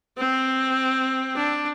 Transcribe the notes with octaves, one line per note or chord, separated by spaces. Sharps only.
C4
D4